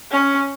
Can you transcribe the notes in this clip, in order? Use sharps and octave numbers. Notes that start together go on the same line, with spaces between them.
C#4